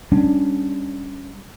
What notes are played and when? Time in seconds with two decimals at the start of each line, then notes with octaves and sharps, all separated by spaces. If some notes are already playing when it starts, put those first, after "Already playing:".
0.12 G3 C#4 D4